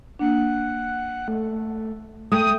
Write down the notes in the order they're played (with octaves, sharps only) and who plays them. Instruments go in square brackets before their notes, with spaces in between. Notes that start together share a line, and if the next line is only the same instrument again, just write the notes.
[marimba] A#3 D4 [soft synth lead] F#5
[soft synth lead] A3
[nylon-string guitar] A3 [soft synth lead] G5 [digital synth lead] D#6